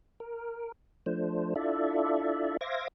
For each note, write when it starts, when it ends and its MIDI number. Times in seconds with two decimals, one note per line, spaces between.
0.20 0.72 70
1.06 1.54 53
1.06 1.54 57
1.06 1.54 62
1.06 1.54 72
1.56 2.57 62
1.56 2.57 64
1.56 2.57 65
1.56 2.57 69
1.56 2.57 74
1.56 2.57 76
2.61 2.88 72
2.61 2.88 76
2.61 2.88 77
2.61 2.88 86
2.61 2.88 92
2.61 2.88 94